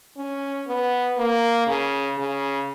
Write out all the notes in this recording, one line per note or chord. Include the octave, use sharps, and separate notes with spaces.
C#4
B3
A#3
C#3
C#3